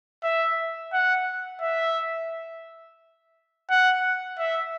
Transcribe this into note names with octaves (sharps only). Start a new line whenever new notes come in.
E5
F#5
E5
F#5
E5